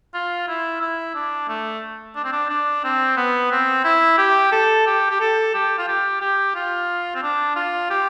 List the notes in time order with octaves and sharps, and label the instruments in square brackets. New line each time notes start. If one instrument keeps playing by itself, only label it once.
[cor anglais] F4
E4
E4
D4
A3
D4
C4
D4
D4
C4
B3
C4
E4
G4
A4
G4
G4
A4
G4
F4
G4
G4
F4
C4
D4
F4
G4